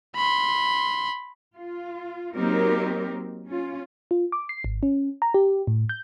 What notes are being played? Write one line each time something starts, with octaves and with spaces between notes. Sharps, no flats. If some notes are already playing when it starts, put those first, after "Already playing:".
B5 C6
F4
F#3 A#3 C4 D#4 G4 A#4
C#4 F4
F4
D6
C7
G#1
C#4
A#5
G4
A2
G6